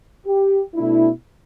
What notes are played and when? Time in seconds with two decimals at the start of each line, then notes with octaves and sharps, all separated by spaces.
0.26 G4
0.75 B2 A3 D4 E4